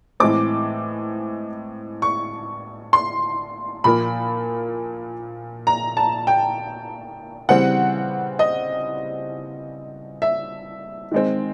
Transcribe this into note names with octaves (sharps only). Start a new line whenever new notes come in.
A2 E3 G#3 C4 D6
C#6
C6
A#2 F3 A#3 B5
A#5
A5
G5
C#3 E3 G3 C4 F#5
D#5
E5
D#3 G#3 C4